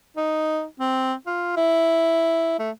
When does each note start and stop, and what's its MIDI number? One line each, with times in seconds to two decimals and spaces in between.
0.17 0.65 63
0.80 1.14 60
1.27 1.55 65
1.57 2.56 64
2.59 2.70 57